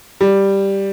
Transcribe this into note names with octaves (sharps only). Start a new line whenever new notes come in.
G3